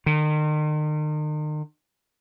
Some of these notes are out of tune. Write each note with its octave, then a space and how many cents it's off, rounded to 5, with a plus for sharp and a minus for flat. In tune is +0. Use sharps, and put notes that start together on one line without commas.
D#3 -40